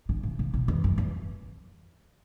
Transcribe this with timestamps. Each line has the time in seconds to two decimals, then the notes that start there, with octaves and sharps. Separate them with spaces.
0.09 D3
0.23 C#3
0.39 C#3
0.54 B2
0.68 E2
0.84 F#2
0.98 E2